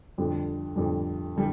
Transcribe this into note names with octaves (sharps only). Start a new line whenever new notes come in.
F2 D3 G3
F2 D3 G3
D3 G3